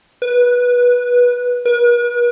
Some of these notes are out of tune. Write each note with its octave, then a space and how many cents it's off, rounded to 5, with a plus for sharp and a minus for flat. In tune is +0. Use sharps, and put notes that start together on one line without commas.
B4 -15
B4 -45